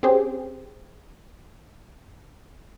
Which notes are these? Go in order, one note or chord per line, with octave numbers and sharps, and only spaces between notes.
C4 C#4 G4 G#4 C5